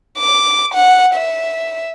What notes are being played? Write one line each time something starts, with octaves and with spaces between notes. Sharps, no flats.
D6
F#5
E5